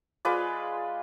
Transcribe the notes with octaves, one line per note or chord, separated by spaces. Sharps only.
G#3 F4 B4 D5